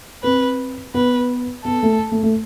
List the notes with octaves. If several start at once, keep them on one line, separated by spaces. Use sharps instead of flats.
C4 B4
B3 B4
B3 A4
A3
A3
A3